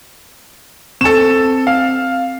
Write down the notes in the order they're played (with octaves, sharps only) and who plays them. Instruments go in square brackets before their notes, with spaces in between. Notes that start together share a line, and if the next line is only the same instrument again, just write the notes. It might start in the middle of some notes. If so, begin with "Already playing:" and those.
[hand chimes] C4 A5 [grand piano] A4 E7
[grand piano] F5